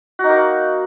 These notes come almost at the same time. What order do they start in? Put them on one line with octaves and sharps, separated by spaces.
F#4 D#4 A#3